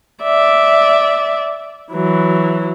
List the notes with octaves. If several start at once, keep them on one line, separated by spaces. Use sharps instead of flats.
D5 E5
E3 F#3